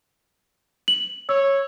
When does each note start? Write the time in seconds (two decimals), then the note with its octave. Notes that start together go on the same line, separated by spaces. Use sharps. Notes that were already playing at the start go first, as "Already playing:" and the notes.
0.88 F#7
1.29 C#5 E6